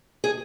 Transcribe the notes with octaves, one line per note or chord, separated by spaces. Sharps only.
G#4